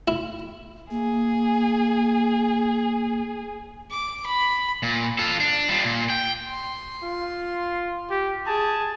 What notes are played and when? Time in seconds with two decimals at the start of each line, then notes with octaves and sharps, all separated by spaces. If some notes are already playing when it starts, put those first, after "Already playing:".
0.08 E4
0.91 A#3 G#4
3.91 D6
4.26 B5
4.83 A#2
5.19 F4 A4
5.40 D4
5.69 G3 F4
5.84 A#2
6.10 G5
6.48 C6
7.03 F4
8.11 G4
8.47 G#4 A5